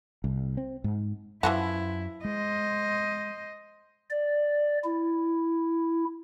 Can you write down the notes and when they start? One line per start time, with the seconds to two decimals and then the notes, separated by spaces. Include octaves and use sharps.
0.24 C2
0.57 C4
0.84 G#2
1.43 F#2 E3 F3 E4 F#4
2.25 G#3 C5 D#5
4.10 D5
4.84 E4